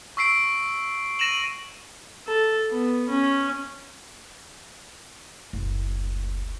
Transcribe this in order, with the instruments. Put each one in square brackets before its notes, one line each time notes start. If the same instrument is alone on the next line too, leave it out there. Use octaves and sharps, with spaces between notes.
[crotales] C#6 E6 B6 C7 D7
A#6 D#7 E7 F#7
[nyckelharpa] A4
B3
C#4
[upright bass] F#1 D2